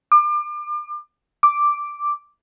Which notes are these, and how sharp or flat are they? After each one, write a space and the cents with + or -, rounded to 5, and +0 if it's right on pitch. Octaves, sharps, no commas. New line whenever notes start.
D6 +35
D6 +0